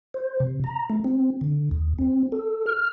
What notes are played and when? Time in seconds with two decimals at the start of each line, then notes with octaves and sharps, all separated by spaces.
0.14 C5
0.40 C3
0.64 A#5
0.90 A3
1.04 C4
1.41 D3
1.71 D#2
1.99 C4
2.32 A4
2.66 F6